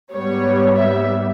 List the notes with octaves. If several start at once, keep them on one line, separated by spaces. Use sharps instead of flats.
G#2 G3 B3 C#5
E5